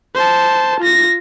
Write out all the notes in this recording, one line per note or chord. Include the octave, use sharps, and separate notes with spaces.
C5 A5
F4 A#6